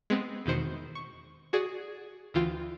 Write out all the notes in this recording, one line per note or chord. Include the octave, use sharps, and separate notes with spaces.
G#3 B3 C4
E2 B2 D#3 C5 C#7
C#6
F#4 G#4 D5
D2 E3 F4 G5 E7